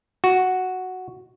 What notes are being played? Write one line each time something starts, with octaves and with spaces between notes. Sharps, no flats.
F#4